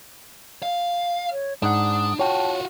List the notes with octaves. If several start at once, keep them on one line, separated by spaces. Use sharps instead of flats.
F5
C#5
G#2 D4 F#5 D#6
F4 F#4 C#5 G5 A5